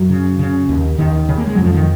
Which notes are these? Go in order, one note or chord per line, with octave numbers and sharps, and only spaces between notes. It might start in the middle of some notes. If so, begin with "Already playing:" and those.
Already playing: F#2 F#3
C#3
C#3
D#2
D#2 D#3
C#3
A#3
G#3
F2 F#3
F3
D#3